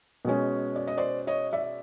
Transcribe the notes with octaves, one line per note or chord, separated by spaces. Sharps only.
B2 G#3 C#4
D5
D#5
C5 D5
C#5 D#5
D5 E5